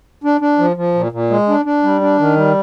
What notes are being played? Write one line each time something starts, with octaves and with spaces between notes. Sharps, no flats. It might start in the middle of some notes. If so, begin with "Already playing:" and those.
D4
D4
F3
F3
A#2
A#2
G#3
D4
D4
G3
D4
D#3
G3